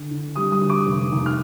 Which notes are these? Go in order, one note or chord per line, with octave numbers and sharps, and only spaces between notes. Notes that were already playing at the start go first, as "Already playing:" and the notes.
Already playing: D3
D3
G3 D#6
D#6
D2
D6
F1
D#2
F6